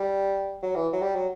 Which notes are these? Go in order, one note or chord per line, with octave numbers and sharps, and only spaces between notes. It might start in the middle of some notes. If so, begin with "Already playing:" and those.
Already playing: G3
F#3
E3
F#3
G3
F#3